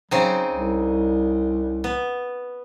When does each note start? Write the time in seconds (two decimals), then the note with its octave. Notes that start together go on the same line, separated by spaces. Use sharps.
0.11 C#3 F#3 C4 D#4
0.51 C2
1.84 B3